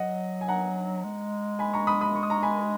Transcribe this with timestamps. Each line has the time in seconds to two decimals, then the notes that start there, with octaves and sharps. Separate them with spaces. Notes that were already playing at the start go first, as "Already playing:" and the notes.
Already playing: F#3 D#5 F#5
0.41 G#5
0.48 F#5 A#5
1.04 G#3
1.59 G#5 B5
1.73 A#5 C#6
1.87 B5 D#6
2.01 B5 D#6
2.15 C#6
2.23 D#6
2.30 A#5 C#6
2.43 G#5 B5